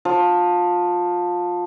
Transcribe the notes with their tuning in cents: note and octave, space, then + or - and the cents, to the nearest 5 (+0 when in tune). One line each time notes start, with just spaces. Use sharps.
F3 +20